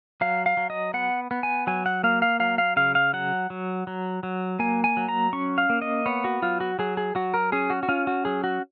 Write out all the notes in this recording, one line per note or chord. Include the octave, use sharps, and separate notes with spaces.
F#3 F5
F5
F#3
D#5
B3 F#5
B3
G#5
F#3 G#5
F#5
A#3 F5
F5
F#3 F5
F5
C#3 F5
F5
F#3 F#5
F#3
F#3
F#3
A#3 G#5
G#5
F#3
A#5
C#4 C#6
F5
A#3
D#5
B3 C#5
F#4
F#3 F4
F#4
F#3 G#4
G#4
F#3 F#4
A#4
C#4 G#4
F#4
F#4
C#4 F4
F#4
F#3 G#4
F#4